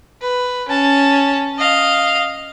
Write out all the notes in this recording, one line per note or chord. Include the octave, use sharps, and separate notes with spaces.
B4
C#4 A5
D#5 F5